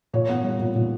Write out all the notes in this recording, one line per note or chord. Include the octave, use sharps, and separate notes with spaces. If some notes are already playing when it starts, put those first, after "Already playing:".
A#2 C#5
B3
G3
A#2
A#2